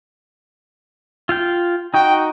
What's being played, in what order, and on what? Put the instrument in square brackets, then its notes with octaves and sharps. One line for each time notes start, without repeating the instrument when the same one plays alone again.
[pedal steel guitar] F4 F5 G5
[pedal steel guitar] D#4 F#4 [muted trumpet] G5